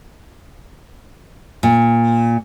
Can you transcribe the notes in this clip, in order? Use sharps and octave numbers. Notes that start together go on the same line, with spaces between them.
A#2